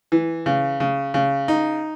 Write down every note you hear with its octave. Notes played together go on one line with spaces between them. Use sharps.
E3
C#3
C#3
C#3
D#4